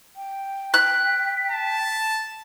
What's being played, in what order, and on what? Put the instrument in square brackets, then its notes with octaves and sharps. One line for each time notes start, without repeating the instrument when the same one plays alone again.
[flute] G5
[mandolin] F#6 [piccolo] B6
[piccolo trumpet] A5